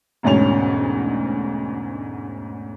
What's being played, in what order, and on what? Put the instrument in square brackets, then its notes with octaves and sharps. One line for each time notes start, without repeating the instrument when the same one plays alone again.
[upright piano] E1 D2 G#2 C#4 F7